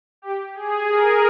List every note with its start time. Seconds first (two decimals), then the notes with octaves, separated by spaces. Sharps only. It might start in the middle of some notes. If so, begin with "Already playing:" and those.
0.22 G4
0.55 G#4
0.89 G#4 A#4